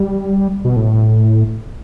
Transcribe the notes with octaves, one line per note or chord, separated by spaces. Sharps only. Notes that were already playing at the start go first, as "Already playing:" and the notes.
Already playing: G3
B2
A2